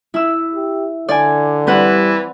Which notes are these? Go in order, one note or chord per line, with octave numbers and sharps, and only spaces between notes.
E4 E6
G4
D3 D5 G#5
E3 G3 C4 B4 F#5